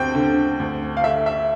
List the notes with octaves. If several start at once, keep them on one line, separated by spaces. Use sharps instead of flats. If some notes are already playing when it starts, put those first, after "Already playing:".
Already playing: D2 C4 G5
D3
D2
F5
A3 E5
E5